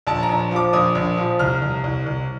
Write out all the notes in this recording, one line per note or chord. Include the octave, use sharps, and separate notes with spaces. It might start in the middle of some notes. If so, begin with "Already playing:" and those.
A#1 A5
A#5
A#1
F3
D6
A#1 D#6
A#1
F3
C2 F6
C2
C2
C2